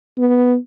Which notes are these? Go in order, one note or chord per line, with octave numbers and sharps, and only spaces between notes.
B3